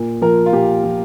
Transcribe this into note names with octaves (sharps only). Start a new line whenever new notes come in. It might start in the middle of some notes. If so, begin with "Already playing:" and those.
Already playing: A#2
F3 A#4
F4
A#2 G4
F3